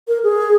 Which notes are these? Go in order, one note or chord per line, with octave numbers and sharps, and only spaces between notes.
A#4
G#4